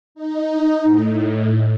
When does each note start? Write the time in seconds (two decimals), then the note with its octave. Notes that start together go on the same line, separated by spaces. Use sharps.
0.15 D#4
0.84 A2